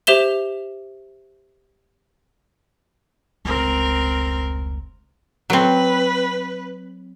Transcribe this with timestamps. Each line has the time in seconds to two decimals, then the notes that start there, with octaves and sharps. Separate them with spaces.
0.07 G4 C5 E5 E7 G7
3.45 F1 C#2 C4 A#4
5.50 F#3 C4 B4